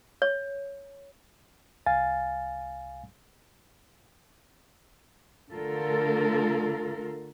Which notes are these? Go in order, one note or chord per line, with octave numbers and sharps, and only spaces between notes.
C#5
C2 F5 G#5 A6
D3 A3 F4 A4 A#4